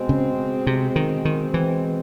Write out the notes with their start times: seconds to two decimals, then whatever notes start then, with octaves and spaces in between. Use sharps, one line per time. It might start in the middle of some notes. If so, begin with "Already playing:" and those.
Already playing: B2 G#3 C4
0.09 C#3
0.67 C3
0.96 D#3
1.25 D#3
1.54 E3